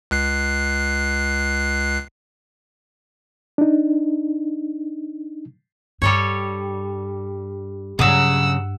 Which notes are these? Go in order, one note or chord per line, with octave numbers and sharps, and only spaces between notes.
C#2 F#6 C7
D4 D#4
G2 G3 A4 C#5
G2 C#3 F#3 F#5 E6